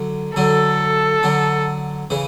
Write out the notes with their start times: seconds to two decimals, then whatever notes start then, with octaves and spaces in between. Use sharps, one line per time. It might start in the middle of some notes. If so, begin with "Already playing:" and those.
Already playing: D3 F#3
0.36 D3 F#3 A4
1.23 D3 F#3
2.10 C#3 E3